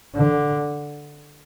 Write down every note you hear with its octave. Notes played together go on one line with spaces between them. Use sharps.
D3